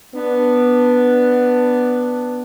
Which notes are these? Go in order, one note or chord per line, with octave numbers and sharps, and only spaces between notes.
B3 D4